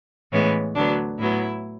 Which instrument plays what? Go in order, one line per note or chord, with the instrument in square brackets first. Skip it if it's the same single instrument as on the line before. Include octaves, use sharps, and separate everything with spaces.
[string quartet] A2 E3 G#3 B3 C#4
D2 D3 F#3 B3 D4
A2 F#3 B3 E4